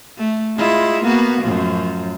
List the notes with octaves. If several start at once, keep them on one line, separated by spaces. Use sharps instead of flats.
A3
G#3 E4 F4
A#3 B3 F#4
F#2 A2 F3